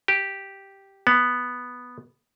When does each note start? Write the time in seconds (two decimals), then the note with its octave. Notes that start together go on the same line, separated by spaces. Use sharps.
0.08 G4
1.07 B3